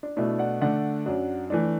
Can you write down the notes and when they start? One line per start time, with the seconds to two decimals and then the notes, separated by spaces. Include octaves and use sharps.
0.03 D4
0.17 B2 A3 D4 E4
0.39 D5 F#5
0.61 D3 A3 D4 D5 F#5
1.06 F#2 F#3 D4
1.50 E3 A3 D4